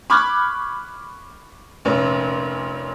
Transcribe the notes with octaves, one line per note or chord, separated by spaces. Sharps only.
B5 C#6 D6 F6 F#6 G#6
F1 A#2 C#4